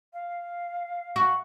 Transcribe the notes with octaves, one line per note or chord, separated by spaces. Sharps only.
F5
F#4